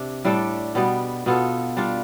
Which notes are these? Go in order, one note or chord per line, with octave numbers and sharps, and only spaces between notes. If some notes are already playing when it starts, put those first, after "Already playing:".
Already playing: C3 D4
A2 G3 D4 A4
B2 G3 B3
B2 B3 F4 A4
G3 D4 F4